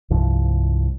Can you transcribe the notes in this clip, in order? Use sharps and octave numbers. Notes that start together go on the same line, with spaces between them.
C2 G2 F3